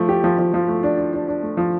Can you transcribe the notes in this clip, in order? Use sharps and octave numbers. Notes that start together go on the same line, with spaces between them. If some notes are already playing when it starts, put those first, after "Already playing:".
Already playing: F3 A3
G4
F3
F3
F3
A3
D4
D4
D4
D4
A3
F3